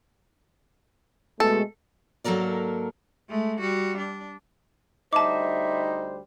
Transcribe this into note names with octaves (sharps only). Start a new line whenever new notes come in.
B2 G#3 A3 A4
G#2 F#3 A#3 A4 A#4 D5
G#3 A3
G3 F#4
D4
D2 G3 D#4 C5 E5 A5 D6